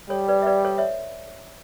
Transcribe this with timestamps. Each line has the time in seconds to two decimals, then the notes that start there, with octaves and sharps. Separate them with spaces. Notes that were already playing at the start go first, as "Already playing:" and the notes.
0.10 G3 A4 C#5
0.28 B4 D5
0.42 E5
0.46 B4 D5
0.65 A4 C#5
0.78 C#5 E5